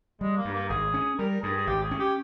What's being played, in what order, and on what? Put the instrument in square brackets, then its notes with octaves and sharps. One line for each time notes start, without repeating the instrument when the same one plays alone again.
[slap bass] G3 [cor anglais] G#3
[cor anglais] A#3
[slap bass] G2
[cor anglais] A#3
[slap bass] G#1 [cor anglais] G#4
[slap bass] C#4
[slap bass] G3 [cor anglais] A#4
[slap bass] G2 [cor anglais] G#4
[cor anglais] G#4
[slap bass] G#1 [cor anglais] G4
[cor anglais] G#4
[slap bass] C#4
[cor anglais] G4